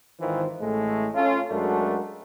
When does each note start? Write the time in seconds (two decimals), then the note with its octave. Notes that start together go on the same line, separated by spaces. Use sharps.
0.20 G#1 D#3 E3 F4 C5
0.60 A1 A2 G#3 A3
1.14 C#4 F4 A4
1.50 F#2 G#3 A3 D4 F#4 A#4